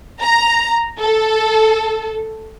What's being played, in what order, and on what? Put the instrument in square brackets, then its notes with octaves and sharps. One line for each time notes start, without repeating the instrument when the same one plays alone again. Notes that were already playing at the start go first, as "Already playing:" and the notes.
[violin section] A#5
A4